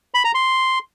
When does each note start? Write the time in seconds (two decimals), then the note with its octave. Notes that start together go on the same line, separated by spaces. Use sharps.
0.14 B5
0.24 A#5
0.35 C6